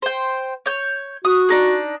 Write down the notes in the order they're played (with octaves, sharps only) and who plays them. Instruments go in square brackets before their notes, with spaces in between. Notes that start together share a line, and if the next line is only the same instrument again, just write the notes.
[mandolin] C5 G5
C#5 G6
[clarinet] F#4 [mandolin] D#6
[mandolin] D4 D#4 G#4